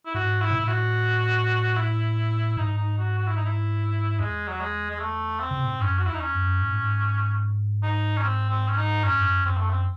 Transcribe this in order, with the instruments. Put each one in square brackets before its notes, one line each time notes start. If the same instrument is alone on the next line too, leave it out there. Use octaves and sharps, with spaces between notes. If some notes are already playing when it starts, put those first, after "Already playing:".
[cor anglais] E4
[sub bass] G#2 [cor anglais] F#4
[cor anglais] E4
[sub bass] C3
[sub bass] A2 [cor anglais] E4
[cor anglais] F#4
E4
[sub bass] G#2 [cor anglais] D#4
[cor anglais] D#4
F#4
F#4
E4
D#4
E4
[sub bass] E2 [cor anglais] G#3
[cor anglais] F#3
G#3
G#3
A3
C4
[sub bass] C#3
C3
A2
G#2
[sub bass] F#2 [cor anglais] C#4
[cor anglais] F#4
[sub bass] E2 [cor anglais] E4
[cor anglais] D#4
C#4
[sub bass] F#2
G#2
A2
G#2
[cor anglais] D#4
C#4
C4
C4
C#4
D#4
[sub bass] F#2 [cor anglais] C#4
[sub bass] G#2
F#2
[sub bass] F#2 [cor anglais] C4
[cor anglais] A3
C4